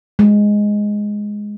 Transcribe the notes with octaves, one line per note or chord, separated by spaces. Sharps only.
G#3